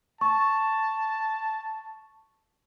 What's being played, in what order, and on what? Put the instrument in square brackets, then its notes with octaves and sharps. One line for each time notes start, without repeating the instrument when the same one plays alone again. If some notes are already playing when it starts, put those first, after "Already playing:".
[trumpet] A5 [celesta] C#6